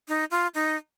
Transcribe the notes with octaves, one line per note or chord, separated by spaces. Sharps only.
D#4
F4
D#4